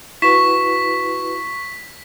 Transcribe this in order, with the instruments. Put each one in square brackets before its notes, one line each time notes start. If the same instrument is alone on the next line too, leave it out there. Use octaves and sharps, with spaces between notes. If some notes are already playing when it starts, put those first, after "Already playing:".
[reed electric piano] E4 F#4 B4 [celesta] C#6 E7 [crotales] B6